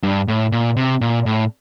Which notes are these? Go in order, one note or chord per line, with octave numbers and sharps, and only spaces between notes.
G2
A2
A#2
C3
A#2
A2